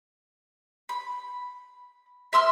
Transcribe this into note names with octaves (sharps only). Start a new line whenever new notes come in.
B5
E5 C6 E6 F6